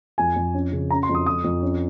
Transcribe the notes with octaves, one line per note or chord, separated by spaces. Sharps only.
F2 G#5
F2
C#4
C#3
C#4 A#5
C6
F2
D#6
F2 D#6
F2
C#4